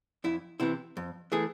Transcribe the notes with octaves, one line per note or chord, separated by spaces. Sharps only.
F2 E4
C3 E3 E4
F2
E3 A3 G#4